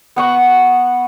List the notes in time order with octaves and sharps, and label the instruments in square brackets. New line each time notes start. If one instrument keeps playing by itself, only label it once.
[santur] B3 F#5 C#6